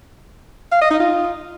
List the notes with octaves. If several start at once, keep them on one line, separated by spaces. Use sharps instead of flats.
F5
D#5
D#4
F4